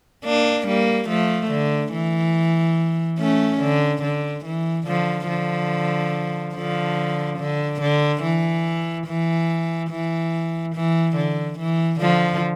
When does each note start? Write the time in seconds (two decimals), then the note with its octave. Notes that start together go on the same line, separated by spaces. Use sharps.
0.24 A#3 D4
0.67 G3 A#3
1.09 F3 A3
1.51 D3
1.93 E3
3.19 A3 C#4
3.61 D3
4.02 D3
4.45 E3
4.87 D3 F3
5.28 D3 F3
6.54 D3 F3
7.38 D3
7.81 D3
8.22 E3
9.07 E3
9.90 E3
10.75 E3
11.16 D3
11.59 E3
12.00 D3 F3